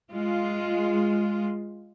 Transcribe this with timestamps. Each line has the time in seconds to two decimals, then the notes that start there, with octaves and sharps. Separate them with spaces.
0.11 G#3 F4